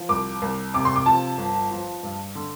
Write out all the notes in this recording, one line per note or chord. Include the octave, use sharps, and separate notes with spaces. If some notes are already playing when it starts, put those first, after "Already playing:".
Already playing: F3
C2 D6
C2
C3 D6
C6
D6
F3 A5
G1
F3
G2
D3